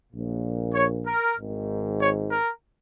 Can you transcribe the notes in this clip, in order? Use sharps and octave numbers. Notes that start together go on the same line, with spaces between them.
A#1 A#2
C#5
A#4
G#1 G#2 D#3
C#5
A#4